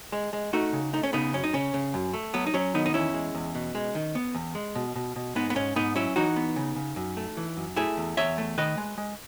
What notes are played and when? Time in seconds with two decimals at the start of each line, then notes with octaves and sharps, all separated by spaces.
0.12 G#3
0.33 G#3
0.53 A3 D#4 F#4
0.73 C#3
0.93 A3 D#4
1.03 C#4
1.13 C#3 B3 D#4
1.33 F#2 C#4
1.44 D#4
1.53 C#3 C#4
1.74 C#3
1.94 F#2
2.13 A3
2.34 F#3 B3
2.47 D#4
2.54 F#3 C#4
2.74 D#3 B3 D#4
2.86 D#4
2.94 E2 C#4 E4
3.14 G#3
3.35 E2
3.55 B2
3.75 G#3
3.95 D#3
4.15 B3
4.35 E2
4.55 G#3
4.75 B2
4.96 B2
5.16 B2
5.35 G#2 B3 D#4
5.50 B3
5.55 G#2 C#4
5.76 G#2 B3 D#4
5.96 F#3 C#4 E4
6.16 E3 D#4 F#4
6.36 B3
6.56 C#3
6.76 C#3
6.96 F#2
7.17 A3
7.37 E3
7.57 F#2
7.77 A3 E4 G#4
7.97 E2
8.17 E2 C#5 E5
8.38 A3
8.58 D#3 B4 D#5
8.78 G#3
8.98 G#3